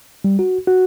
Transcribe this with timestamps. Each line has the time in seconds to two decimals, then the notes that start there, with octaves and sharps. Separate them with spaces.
0.24 G3
0.39 F#4
0.67 F#4